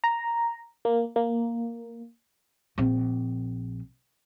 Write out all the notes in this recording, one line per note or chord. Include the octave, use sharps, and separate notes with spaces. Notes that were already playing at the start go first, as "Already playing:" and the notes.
A#5
A#3
A#3
A#1 C4